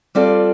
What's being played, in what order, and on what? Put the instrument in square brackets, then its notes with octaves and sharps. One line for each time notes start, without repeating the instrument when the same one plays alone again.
[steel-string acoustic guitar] G3 C4 F4 A4 D5